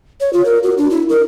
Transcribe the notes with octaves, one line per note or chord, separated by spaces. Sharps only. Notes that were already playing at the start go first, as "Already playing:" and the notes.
C#5
F4
A#4
F#4
D4
E4
A#4